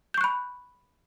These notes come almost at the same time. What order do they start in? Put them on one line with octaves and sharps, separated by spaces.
G6 C#6 F#6 B5